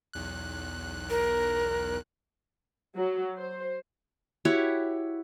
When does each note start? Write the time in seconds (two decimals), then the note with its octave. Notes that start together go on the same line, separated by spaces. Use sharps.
0.13 B1 E2 F#6
1.10 A#4
2.96 F#3
3.37 C5
4.45 E4 F#4 G4 C#5